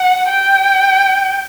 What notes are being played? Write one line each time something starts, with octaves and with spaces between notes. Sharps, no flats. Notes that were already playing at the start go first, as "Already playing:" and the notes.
Already playing: F#5
G5